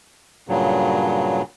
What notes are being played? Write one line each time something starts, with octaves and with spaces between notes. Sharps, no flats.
G2 A#2 C#3 F#3